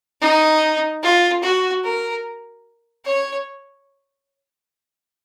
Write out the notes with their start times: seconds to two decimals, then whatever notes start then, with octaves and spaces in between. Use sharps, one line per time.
0.21 D#4
1.03 F4
1.43 F#4
1.84 A#4
3.05 C#5